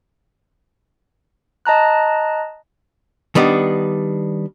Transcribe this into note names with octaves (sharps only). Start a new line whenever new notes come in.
D#5 A5 A#5 F#6
D#3 G3 B3 D4